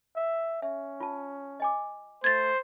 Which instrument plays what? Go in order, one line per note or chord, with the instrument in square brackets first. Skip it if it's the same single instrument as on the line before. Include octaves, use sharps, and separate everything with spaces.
[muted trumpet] E5
[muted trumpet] C#4 [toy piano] E5
[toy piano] F4 A5
D#5 G#5 D6
[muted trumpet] A3 [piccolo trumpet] C5 [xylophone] G#6 A6